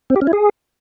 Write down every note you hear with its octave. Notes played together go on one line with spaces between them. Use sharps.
C4
G4
C#4
E4
G#4